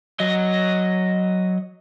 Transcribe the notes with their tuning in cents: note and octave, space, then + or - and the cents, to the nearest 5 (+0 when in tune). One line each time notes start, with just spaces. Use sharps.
F#3 +0 D#5 +0